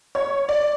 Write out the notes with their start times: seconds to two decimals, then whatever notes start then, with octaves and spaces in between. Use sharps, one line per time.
0.15 C#5
0.49 D5